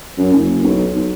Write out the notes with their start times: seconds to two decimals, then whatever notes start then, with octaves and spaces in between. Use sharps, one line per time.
0.17 F#2
0.32 F#1
0.64 B1
0.95 B1